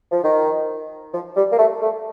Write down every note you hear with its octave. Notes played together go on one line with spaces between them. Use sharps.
F3
D#3
F3
G3
A#3
A3
A3